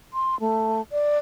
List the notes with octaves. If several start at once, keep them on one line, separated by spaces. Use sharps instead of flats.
C6
A3
D5